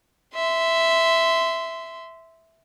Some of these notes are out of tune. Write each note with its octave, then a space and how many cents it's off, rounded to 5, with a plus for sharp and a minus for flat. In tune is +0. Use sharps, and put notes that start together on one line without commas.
E5 +0 C6 -20